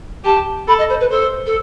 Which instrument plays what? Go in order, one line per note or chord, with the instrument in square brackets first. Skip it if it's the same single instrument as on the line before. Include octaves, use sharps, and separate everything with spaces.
[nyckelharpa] G4 [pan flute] A5
[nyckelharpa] A4 [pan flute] B5
[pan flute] D#5
C5
B4
[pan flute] A4 [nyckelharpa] C5
[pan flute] A4